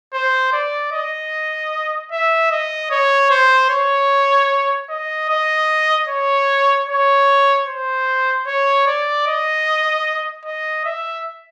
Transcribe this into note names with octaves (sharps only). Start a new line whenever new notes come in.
C5
D5
D#5
E5
D#5
C#5
C5
C#5
D#5
D#5
C#5
C#5
C5
C#5
D5
D#5
D#5
E5